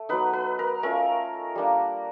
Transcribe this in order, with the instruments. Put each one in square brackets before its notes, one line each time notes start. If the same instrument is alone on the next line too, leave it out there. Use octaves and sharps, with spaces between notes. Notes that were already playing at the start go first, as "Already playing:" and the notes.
Already playing: [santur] A3
F#3 B3 D#4 B4
B4
A#4
A3 C#4 F4 A#4
G3 A#3 D4